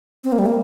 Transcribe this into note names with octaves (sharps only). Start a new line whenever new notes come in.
C4
A#3
G3
A#3